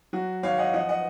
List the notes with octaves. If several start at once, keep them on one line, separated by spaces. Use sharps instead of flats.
F#3 F#4
G#1 C#5 F5
D#5 F#5
F3 D#5 F#5
D#5 F#5